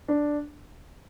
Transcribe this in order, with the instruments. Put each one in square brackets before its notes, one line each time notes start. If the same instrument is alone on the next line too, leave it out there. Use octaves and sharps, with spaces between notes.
[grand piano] D4